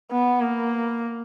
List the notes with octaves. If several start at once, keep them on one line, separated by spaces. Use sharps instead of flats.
B3
A#3